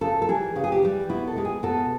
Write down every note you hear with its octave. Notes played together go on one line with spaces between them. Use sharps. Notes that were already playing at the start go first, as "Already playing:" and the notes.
C#3 A4
A4
E3 G3 G#4
C#3 G4
G#4
G4
E3 G3
B2 E4
A4
G#3 G4
G#4
B2 A4